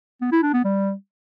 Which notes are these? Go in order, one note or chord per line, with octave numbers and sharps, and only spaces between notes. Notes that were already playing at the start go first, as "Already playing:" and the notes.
B3
E4
D4
B3
G3